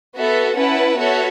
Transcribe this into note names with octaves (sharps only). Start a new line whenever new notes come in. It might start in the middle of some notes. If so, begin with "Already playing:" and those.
B3 F#4 A4 E5
C#4 E4 B4 F#5 A5
B3 F#4 A4 C#5 E5